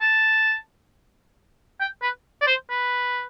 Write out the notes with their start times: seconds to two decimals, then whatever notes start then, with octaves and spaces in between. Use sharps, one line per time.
0.02 A5
1.80 G5
2.02 B4
2.42 D5
2.47 C5
2.70 B4